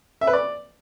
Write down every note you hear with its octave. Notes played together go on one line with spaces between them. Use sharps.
E5
B4
D5